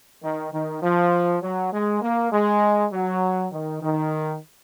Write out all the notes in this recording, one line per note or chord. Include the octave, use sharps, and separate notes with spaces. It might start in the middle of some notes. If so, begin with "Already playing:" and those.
D#3
D#3
F3
F#3
G#3
A#3
G#3
F#3
D#3
D#3